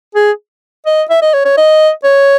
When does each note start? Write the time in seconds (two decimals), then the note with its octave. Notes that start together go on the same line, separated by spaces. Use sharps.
0.15 G#4
0.86 D#5
1.10 E5
1.22 D#5
1.33 C#5
1.45 C#5
1.57 D#5
2.04 C#5